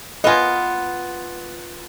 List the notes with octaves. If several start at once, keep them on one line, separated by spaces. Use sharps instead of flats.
B3 F4 D#5 F5 G#5